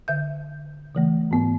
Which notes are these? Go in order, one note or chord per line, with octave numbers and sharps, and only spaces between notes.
D3 E5 G6
C#3 E3 A3
G#2 B3